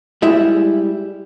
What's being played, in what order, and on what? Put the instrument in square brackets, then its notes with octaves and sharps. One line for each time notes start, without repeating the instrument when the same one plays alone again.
[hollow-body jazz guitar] G3 G#3 E4 E5